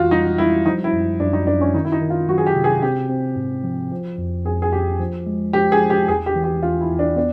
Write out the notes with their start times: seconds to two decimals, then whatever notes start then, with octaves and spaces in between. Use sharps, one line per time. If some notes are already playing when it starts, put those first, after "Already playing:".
Already playing: F2 E3 F4 F#4
0.11 G3 D#4
0.38 G3 E4
0.66 F3 D#4
0.84 E4
0.93 F#2
1.20 F#2 D4
1.33 D#4
1.47 F#2 D4
1.61 C#4
1.74 D#3 D#4
1.85 E4
1.92 D#4
2.01 D#3
2.10 F4
2.28 F#3 F#4
2.38 G#4
2.46 G4
2.55 C3
2.64 G#4
2.82 C4 G4
3.09 C4
3.36 G#2
3.64 F3
3.91 F3
4.18 F2
4.45 F2 G#4
4.62 G#4
4.72 F2 G4
5.00 F3
5.27 G#3
5.53 F3 G4
5.72 G#4
5.81 F3
5.90 G4
6.08 E2 G#4
6.26 G4
6.36 E3
6.44 G4
6.63 E2 F4
6.80 E4
6.90 E2
6.99 D4
7.16 B3 D4